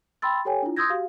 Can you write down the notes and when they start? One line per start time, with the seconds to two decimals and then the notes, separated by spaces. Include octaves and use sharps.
0.22 G5 B5 C6 E6 A6
0.45 G4 A4 C#5 G5 G#5
0.62 D4 E4 F4
0.77 C6 D#6 E6 G6 G#6 A#6
0.90 F#4 G4 F5